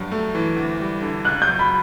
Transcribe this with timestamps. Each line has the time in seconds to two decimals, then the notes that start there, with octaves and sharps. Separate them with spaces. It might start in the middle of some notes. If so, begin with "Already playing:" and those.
Already playing: G2 F#3
0.12 A3
0.35 E3
0.56 D2
0.80 G3
1.02 D3
1.24 C#2 F#6
1.42 G6
1.48 F#3
1.59 B5